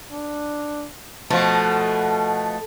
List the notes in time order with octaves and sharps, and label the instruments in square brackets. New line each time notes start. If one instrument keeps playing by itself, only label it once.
[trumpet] D4
[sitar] B2 F3 [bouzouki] A3 [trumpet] F#5